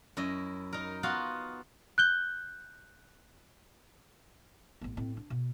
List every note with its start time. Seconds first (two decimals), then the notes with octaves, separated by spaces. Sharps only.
0.17 F#2 E4 D#5
0.73 D#4 A#4
1.03 B3 F4 F#4 F5
1.98 F#6 G6 G7
4.81 A1 B3
4.97 A2 C4
5.17 D4
5.30 B2